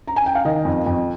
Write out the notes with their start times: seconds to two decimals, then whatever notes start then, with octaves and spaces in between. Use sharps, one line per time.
0.08 A#5
0.16 G#5
0.26 G5
0.35 F5
0.45 D#3 D#5
0.65 F2
0.86 F2